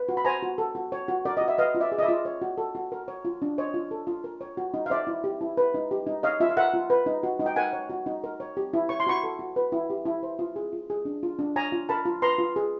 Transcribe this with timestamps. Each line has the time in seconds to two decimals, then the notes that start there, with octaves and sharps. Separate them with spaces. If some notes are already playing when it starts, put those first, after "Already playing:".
Already playing: B4
0.09 F#4
0.17 B5
0.25 C5 G#5 A#5
0.43 F#4
0.58 A4
0.75 F#4
0.92 C#5
1.08 F#4
1.25 A#4 D5
1.37 F#4 D#5
1.48 E5
1.58 B4 D#5 F5
1.75 F4
1.80 D5 E5
1.92 G#4
1.99 D#5
2.02 D5 E5
2.08 F4
2.25 C#5
2.42 F#4
2.58 A4
2.75 F#4
2.92 A#4
3.08 C#5
3.25 F4
3.42 D4
3.58 C5 C#5 D#5
3.74 F4
3.91 A4
4.07 F4
4.24 A#4
4.41 C#5
4.57 F#4
4.74 D#4
4.86 F5
4.90 C5 D5 E5
5.07 E4
5.24 G4
5.41 E4
5.57 B4
5.74 D#4
5.91 G4
6.07 D#4
6.23 C#5 D#5 F5
6.40 F4 E5
6.49 F5
6.57 A#4 E5 F#5
6.74 F4
6.90 B4
7.06 D#4
7.23 F#4
7.40 D#4
7.46 G5
7.56 A#4 F#5 G#5
7.73 C#5
7.90 F#4
8.06 D#4
8.24 A#4
8.40 C#5
8.57 G4
8.73 E4
8.89 C#5 C#6
9.00 C6
9.07 F#4 B5 C#6
9.24 A4
9.39 F#4
9.56 B4
9.72 E4
9.90 G4
10.06 E4
10.23 C5
10.39 F4
10.56 G#4
10.73 F4
10.90 G#4
11.05 D4
11.23 F4
11.39 D4
11.56 C#5 G#5 A#5
11.72 F4
11.89 A#4 A5 B5
12.05 F4
12.22 B4 A#5 C6
12.39 F4
12.56 G#4